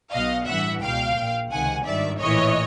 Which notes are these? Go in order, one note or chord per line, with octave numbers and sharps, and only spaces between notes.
B1 B2 D#5 F5
A1 G2 E3 E5 F#5
C#2 B2 F5 G5
A#1 A#2
C#2 C3 D#3 F#5 G#5
G#1 G2 D#3 D5 E5
A#1 A2 E3 C#5 D#5